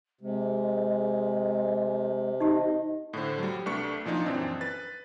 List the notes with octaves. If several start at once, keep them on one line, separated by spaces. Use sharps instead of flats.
C3 G#3
D#4 G4 D#5
A2 D3 C5
F#3 G3
C2 A3 D4 B4 C#6 C#7
A#2 F3 D4 D#4
F#2 E3 C4 D4
B4 A6